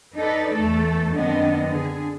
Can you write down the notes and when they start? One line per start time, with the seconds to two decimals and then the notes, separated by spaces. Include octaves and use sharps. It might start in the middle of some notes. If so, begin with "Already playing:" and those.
0.17 D#4 A4 B4 D5
0.52 E2 A3 A4
1.14 F#2 D#3 B3 C4 D4 D#5
1.69 D3 G#4